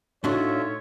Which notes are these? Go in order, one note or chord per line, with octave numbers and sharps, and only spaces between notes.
A2 D4 D#4 F4 F#4 C#5 E5